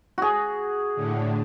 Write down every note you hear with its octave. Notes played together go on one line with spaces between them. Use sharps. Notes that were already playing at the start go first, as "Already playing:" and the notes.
F#4 G#4
A2 D3